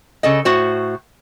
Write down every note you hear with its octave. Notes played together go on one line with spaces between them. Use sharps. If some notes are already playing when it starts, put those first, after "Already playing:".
C#3 A4 D#5
A2 F#4 C5